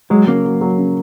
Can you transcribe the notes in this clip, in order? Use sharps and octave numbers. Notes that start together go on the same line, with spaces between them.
F#3 G#3
C#3 A#3
F#3
F#3
C#3